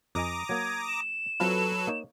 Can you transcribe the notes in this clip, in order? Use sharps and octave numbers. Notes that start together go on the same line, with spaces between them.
F2 D#5 G#5 A#5 D6 D#6
F#3 A#3 G#6
E7
F#3 C4 E4 F4 A4 B4
A#3 D#4 C#5